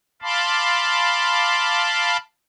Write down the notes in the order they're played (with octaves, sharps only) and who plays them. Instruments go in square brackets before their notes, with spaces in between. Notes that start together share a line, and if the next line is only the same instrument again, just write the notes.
[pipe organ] F5 A5 B5 C6 D6